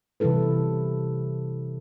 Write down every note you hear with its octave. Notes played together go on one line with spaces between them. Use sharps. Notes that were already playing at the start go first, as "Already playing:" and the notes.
C3 E3 G3 E4 A4 B4